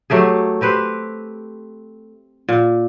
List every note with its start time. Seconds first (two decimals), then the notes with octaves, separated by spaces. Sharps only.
0.10 F#3 A3 G4 G#4
0.61 C4 G4 B4 C5
2.49 A#2